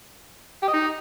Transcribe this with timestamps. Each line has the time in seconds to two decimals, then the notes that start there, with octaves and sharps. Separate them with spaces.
0.63 G4
0.68 D#5
0.73 D#4